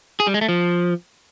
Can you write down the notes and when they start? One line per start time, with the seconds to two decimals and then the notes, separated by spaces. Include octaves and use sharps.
0.20 G#4
0.27 G3
0.34 G#3
0.41 A3
0.49 F3